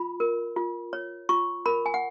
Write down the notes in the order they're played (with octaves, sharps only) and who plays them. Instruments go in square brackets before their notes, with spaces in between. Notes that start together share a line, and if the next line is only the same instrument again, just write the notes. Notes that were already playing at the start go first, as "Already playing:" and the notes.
Already playing: [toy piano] F4 B5
A#4
F4
C#5
F4 C#6
A#4 B5
G#5
F#5